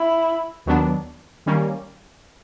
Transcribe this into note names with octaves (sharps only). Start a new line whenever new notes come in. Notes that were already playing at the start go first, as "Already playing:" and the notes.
Already playing: E4
D#2 D#3 F#3 B3 D4
D#3 G3 A#3 C#4